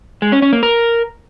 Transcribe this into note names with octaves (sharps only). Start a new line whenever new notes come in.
G#3
C#4
C#4
A#3
A#4